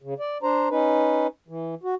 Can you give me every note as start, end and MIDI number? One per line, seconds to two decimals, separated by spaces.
0.02 0.14 49
0.20 0.38 74
0.43 0.69 62
0.43 0.69 72
0.43 0.69 82
0.70 1.27 61
0.70 1.27 63
0.70 1.27 71
1.48 1.75 52
1.83 1.95 66